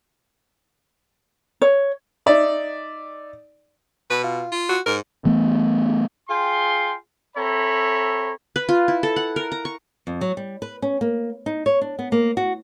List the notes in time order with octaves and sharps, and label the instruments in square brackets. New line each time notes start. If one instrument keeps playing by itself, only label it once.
[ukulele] C#5
[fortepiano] D#4 D5 E5
[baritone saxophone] B2 [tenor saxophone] B4
[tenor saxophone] F4
[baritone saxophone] F4
[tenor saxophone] F#4
[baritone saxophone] G#2 [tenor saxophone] A#4
[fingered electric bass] E3 A3 B3
[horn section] F4 G#4 G5 C6
C4 A4 C#5 E5 A#5 B5
[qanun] B4
F4
E4
A4
F#5
A#4
A#5
C#6
[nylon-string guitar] F2
F#3
G3
B4
C#4
A#3
D#4
C#5
D4
B3
A#3
F#4